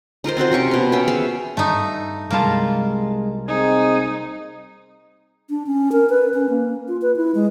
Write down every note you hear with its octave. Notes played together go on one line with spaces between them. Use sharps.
D#4 F4 A#4 C5
C4 F4 F#4 C5
C3 C#4 C#6 D6
B2 F5
B3 C#4 E5 G5
G#4 E5 F5
G2 A3 D#4
C2 G3 G#3 A#3 F4 A5
C4 D#4 G#4 G#5
D4
C#4
A#4
B4
C#4
A#3
F4
B4
E4
G#3